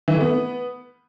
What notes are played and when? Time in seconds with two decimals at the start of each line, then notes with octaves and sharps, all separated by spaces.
0.08 E3
0.14 A3
0.20 B3